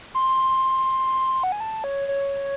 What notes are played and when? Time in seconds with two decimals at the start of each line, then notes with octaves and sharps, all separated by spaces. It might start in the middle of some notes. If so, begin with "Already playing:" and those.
0.15 C6
1.43 F#5
1.52 G#5
1.60 A5
1.84 C#5
2.08 C#5